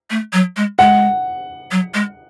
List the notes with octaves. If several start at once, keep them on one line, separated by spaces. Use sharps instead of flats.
A3
F#3
G#3
G#3 F#5
F#3
G#3